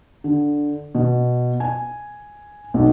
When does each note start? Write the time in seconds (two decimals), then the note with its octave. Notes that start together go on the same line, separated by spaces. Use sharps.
0.24 D3
0.95 B2
1.60 G#5
2.74 B1